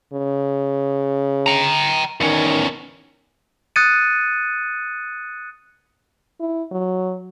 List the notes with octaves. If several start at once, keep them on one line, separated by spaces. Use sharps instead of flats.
C#3
G5 A#5
E2 D#3 C#4
D#6 F#6 G#6 A6 C#7 D#7
E4
F#3